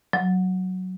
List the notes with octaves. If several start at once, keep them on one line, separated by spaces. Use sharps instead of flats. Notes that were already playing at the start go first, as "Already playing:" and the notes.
F#3